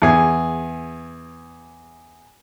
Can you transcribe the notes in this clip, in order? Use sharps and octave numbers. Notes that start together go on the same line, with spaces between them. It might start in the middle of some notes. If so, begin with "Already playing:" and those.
E2 G#4